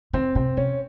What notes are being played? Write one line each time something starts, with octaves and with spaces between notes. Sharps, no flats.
D#3 C4
C3 C4
C3 C#4